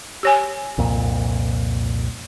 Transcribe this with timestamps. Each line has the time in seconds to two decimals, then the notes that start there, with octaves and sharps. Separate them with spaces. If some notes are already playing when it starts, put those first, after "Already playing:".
0.23 G4 C#5 G#5
0.78 C2 F2 A#2